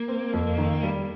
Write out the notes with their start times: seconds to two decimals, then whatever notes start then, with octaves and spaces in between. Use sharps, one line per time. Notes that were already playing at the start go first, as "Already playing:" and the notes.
Already playing: A#3
0.08 C4
0.33 F2
0.58 D#3
0.83 G3